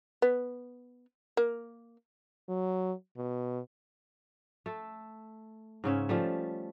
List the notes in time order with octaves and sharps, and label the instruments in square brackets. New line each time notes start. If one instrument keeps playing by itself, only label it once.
[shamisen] B3
A#3
[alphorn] F#3
B2
[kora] A3 A4
G#2 C#3 C#4 E5
F3 G3 A3